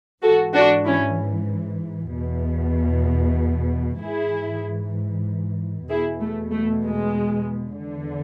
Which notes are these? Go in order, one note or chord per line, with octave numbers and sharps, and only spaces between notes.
G#2 E3 F#4 A4
D4 F#4
C#4 E4
E2 B2
G#2 E3 E4 G#4
E2 B2 E4 G#4
A3
A3
G#3
E2 D3